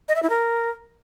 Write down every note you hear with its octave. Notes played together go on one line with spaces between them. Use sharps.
D#5
E5
E4
A#4